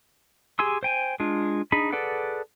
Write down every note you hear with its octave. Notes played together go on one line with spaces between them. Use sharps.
G4 G#4 G#5 C6 E6
C5 G5 G#5
G#3 D4 F4
D4 D#4 G#4 B5
G#4 A4 B4 D5 F#5